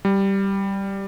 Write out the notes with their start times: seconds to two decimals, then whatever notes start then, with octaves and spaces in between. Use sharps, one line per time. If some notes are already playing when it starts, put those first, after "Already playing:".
0.05 G3